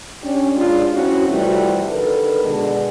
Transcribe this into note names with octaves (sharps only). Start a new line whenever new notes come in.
C#4 D4 G4
G#2 G#3 D4 F4
C4 C#4 E4 F#4
C3 E3 F3 G3 A3 F#4
D3 D#3 A4 B4
B2 D3 G#3